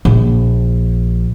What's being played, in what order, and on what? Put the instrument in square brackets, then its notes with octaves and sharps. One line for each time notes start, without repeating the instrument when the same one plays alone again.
[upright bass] A#1